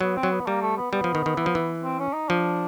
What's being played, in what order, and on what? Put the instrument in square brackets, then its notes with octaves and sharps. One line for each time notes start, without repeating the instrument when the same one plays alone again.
[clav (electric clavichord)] F#3 [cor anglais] B3
[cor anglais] C4
[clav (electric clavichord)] F#3
[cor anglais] B3
[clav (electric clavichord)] G3 [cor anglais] A#3
[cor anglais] A3
B3
[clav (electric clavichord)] G3 [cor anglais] B3
[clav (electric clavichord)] F3
D#3
D#3
E3
F3
E3
[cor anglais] C4
C#4
D#4
[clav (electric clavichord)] F3 [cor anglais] D4